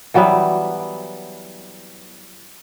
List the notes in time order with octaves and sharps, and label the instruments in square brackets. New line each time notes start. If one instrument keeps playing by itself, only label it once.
[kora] E3 F#3 G3 B3